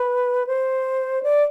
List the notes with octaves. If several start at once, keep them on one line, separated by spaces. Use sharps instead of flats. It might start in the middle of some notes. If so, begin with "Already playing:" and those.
Already playing: B4
C5
D5